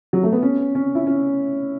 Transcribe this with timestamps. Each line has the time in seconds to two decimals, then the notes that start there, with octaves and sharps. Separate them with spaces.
0.13 F#3
0.23 A3
0.32 B3
0.42 C#4
0.75 C#4
0.95 E4
1.07 C#4